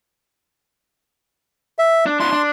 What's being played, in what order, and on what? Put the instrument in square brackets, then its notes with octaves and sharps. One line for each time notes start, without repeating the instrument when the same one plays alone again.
[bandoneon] E5
[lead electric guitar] D4
[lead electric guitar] D4 E4 [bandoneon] C6
[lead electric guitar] D4